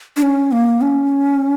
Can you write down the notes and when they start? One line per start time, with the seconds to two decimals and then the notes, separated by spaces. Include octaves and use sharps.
0.16 D4
0.22 C#4
0.52 A#3
0.81 C#4